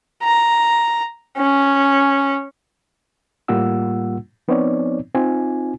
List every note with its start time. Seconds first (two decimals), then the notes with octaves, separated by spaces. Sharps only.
0.24 A#5
1.38 C#4
3.48 A2 G3 A#3 F4 F#5 E6
4.48 F3 B3 C4 D#4 C#5 D5
5.15 C4 D#4 F4 G#5